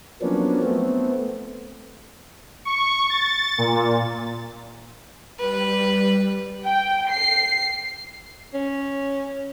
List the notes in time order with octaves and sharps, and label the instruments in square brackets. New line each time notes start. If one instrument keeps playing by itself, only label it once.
[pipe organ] F3 F#3 A#3 B3 C#4 D4
A3 B3 C4
[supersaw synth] C#6
A6
A#2
[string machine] G3 [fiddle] B4
[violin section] G5
C7
[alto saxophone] C#4